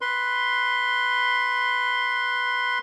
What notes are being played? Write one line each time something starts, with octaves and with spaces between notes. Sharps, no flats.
B4 C6